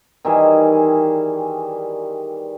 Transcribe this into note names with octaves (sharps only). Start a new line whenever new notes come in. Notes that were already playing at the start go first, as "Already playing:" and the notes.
D#3 E3 G3 G#4